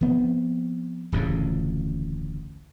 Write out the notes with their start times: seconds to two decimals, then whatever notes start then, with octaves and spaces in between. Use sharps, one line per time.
0.01 F3 B3 C4
1.12 D1 A1 F2 C#3